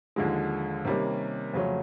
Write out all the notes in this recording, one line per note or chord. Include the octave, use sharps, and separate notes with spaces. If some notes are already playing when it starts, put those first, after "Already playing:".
D#2 D3 F3 G#3
C3 D#3 G3 A#3 C#4
F2 C#3 F#3 A3 C#4